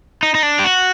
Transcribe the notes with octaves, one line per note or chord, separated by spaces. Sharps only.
D#4
D#4
D4
G4
F#4